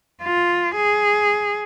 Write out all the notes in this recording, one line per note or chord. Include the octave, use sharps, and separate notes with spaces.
F4
G#4